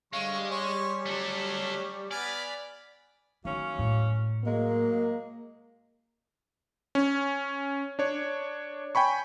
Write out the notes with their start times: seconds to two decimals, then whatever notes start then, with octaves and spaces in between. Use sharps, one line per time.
0.13 D3 G3 G#3 C#5 F5 C#6
0.51 C#5 G#5 C6 C#6
1.06 F#3 A3 C#4 D4
2.11 B3 D5 G#5 B5 F6
3.45 D#3 F#3 A#3 C#4
3.79 A2
4.44 F#3 G#3 A#3
6.95 C#4
7.99 D4 C#5
8.95 G5 G#5 B5 C#6